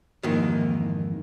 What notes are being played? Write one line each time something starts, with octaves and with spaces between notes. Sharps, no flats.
F2 G#2 D#3 E3 A#3